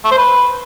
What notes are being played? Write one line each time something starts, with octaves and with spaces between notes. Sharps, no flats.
A3
C5
B4